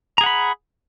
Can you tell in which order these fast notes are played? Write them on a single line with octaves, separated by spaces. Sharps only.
A#5 G#4 F#5 B5